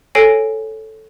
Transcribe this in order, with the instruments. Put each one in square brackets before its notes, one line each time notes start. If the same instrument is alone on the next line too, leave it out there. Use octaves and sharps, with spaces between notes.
[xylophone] A4 C#5 G#5 A#6 C7 D7